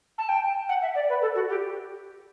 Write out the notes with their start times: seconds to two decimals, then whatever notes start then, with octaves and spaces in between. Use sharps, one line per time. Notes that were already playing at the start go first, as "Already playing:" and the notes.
0.18 A5
0.29 G5
0.69 F#5
0.82 E5
0.95 D5
1.09 B4
1.22 A4
1.35 F#4
1.49 G4